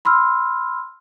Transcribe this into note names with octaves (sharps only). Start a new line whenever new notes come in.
B5 C6 E6 F6